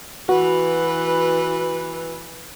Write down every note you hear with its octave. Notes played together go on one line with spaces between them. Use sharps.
E3 F#4 B4